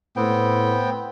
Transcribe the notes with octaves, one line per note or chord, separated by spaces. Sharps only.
A2 B3 C4 G5